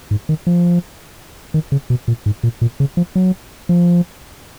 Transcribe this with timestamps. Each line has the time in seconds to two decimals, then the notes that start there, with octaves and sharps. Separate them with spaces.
0.11 G#2
0.29 D#3
0.47 F3
1.54 D#3
1.72 C#3
1.90 B2
2.08 A#2
2.26 G#2
2.43 A#2
2.61 A#2
2.80 C#3
2.97 F3
3.15 F#3
3.69 F3